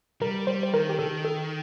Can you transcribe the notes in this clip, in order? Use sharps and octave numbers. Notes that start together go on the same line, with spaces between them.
G3 A#4
G3 C5
C5
D#3 A#4
G4
D#3 A4
A4